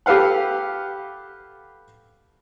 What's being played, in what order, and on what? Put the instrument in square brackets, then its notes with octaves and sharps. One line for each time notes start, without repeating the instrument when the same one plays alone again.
[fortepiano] G4 A4 B4 F5 F#5